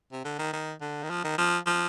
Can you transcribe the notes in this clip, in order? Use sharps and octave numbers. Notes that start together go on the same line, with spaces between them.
C3
D3
D#3
D#3
D3
D#3
F3
D#3
F3
F3